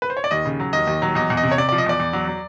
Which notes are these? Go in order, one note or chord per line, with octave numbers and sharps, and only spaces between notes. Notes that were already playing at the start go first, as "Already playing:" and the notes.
B4
C5
C#5
D5
D#2 D#5
C#3
F#3
D#2 D#5
D#2
F#3
E2 D#5
E2
D#5
C3
C#5
C3 D5
D5
F3
D#5
E2 D5
E2
F#3
F#3